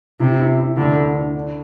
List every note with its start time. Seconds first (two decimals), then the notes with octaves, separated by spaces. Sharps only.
0.20 C3 E4
0.39 E4
0.59 E4
0.77 D2 D3
0.97 D2
1.15 D3
1.35 D4